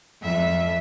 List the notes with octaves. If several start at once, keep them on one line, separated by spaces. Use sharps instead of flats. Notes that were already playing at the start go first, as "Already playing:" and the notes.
F2 E5